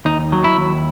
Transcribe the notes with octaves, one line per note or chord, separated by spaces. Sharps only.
D#2 D#4
F#3
E4
D#2